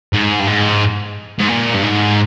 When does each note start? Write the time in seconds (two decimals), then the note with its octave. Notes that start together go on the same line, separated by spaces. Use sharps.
0.13 G#2
0.40 G2
0.47 G#2
1.39 G#2
1.48 A#2
1.74 G2
1.83 G#2